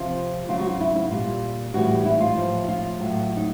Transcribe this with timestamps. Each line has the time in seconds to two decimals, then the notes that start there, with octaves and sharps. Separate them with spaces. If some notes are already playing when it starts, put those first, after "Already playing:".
Already playing: C3 F3 F4
0.48 C#3 F#3 F4
0.59 F#4
0.70 F4
0.80 E4
0.95 E4
1.11 A#2 G3 F4
1.74 A2 E3 G3 F#4
2.05 E4
2.20 F4
2.36 A2 F3
2.68 F4
2.99 A2 F#3
3.37 D#4